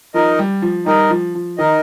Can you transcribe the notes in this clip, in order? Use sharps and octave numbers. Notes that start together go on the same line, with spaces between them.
F3 D#4 A#4 D#5
G3
F3
G3 D#4 A#4 D#5
F3
F3
D#3 D#4 A#4 D#5